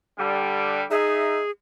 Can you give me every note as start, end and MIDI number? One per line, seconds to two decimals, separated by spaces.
0.18 0.84 50
0.18 0.84 55
0.91 1.40 63
0.91 1.50 68
0.91 1.40 76